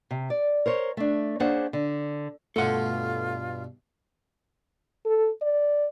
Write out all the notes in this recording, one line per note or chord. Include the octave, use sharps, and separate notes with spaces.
C3
D5
A#4 C5 C#5
A3 D4
A#3 C#4 D4 G#4 C5 F#5
D3
G2 B2 A3 F4 A4 F#5
A4
D5